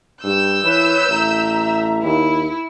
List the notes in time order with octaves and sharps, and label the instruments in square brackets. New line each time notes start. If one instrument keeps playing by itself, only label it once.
[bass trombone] G2 [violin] E6 G6
[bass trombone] E3 [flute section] B4 C#5
[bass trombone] A1 [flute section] E5 A#5
[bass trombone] D#2 [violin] E4